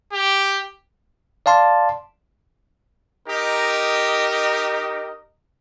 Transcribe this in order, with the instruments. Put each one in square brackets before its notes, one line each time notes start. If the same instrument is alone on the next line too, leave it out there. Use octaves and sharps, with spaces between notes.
[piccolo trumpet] G4
[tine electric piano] D5 F5 A5 C6
[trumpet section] D#4 G4 A#4 D#5